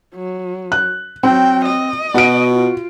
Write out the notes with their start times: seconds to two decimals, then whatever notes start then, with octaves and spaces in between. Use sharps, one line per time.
0.15 F#3
0.72 F#6
1.23 F#3 C4 G5
1.65 D#5
2.14 B2 F#4 D7
2.51 F4